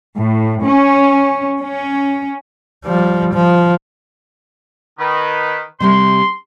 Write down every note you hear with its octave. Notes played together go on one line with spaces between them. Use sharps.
A2
C#4
C#4
F3 G3
F3
D#3 B4
C3 G3 C4 C6